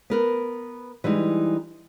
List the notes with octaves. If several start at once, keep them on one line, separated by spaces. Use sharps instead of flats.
B3 A#4 B4
E3 G3 G#3 D#4